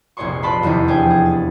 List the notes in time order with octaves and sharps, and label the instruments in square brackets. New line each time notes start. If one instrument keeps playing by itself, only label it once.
[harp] F1 A#1 G#4 D5 C6 C#6
F4 B4 D5 A5 B5 C6
F1 E2 D#3 F3
D4 G4 G#4 C5 G5 G#5
G#4
A6